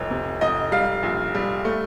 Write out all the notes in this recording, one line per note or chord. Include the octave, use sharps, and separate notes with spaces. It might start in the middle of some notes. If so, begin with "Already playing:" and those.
Already playing: F1 C2 C#5
C3
F1 D#5
G3 F5
A#1
G3
A3